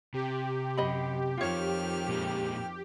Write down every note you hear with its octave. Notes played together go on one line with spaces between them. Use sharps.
C3 G4
F#2 D#5 B5
F2 D#3 F4 C#5 F6
A#2 G#3